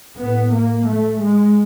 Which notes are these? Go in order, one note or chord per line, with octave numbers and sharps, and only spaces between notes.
A2 B3
A#3
A3
G#3